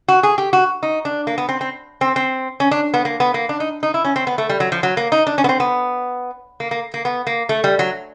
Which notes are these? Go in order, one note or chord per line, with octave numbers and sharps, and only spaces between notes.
F#4
G#4
G4
F#4
D#4
D4
A#3
B3
C4
C4
C4
C4
C#4
D4
B3
A#3
B3
A#3
D4
D#4
D#4
E4
C#4
C4
B3
A3
G3
F#3
F3
F#3
A#3
D#4
D4
C#4
B3
C4
B3
A#3
A#3
A#3
B3
A#3
A3
G3
F#3